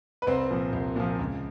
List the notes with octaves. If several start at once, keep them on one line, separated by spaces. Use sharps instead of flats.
B4
C2 C4 C5
A#2 F3
C2
A#2 F3
C#2